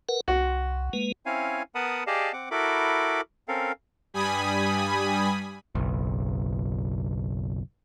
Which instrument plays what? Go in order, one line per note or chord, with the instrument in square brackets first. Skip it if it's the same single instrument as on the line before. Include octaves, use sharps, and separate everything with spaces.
[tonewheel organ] A#4 B4 F#5
[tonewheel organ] C2 [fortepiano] F#4
[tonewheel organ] G#3 A#3 B4
[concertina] C4 C#4 E4 C#5 F5 G#5
B3 A#4 F#5 A5 B5 D#6
G4 G#4 D5 D#5 F5 A5
C4 F#5 D6
E4 F#4 A4 A#4 B5 D6
C4 C#4 A4 A#4 F5
[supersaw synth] G2 G3 G#5 B5 D#6
[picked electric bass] F#1 B1